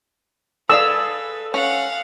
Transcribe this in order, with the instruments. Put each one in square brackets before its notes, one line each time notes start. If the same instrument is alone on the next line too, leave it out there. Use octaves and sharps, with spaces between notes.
[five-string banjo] G#4 D5 F5 [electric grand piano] A4 D#6 [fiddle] B4 [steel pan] E6
[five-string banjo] C#4 [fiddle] F5 F#5